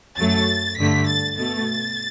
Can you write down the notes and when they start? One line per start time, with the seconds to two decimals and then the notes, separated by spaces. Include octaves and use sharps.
0.16 F#2 F#3 A3 A6
0.77 G2 D3 A3 B6
1.07 A6
1.36 B2 A3 A6